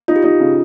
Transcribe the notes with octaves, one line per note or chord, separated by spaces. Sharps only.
D#4 F4
G4
D#4 F4
C#3